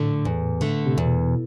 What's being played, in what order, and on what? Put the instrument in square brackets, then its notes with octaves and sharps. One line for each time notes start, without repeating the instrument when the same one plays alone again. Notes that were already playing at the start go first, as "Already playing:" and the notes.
Already playing: [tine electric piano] A2 [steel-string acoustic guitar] D3 A3
[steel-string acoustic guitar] E2
D3 A3
[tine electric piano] C3
[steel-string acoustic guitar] E2 [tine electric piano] B2